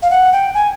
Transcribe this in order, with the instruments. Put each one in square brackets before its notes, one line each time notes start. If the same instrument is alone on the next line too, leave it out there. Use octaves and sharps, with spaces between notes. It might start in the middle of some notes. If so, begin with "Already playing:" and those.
[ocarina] F5
F#5
G5
G#5